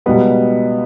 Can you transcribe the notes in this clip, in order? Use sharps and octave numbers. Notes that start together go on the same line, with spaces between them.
C#2 B2 G3 B3 D#4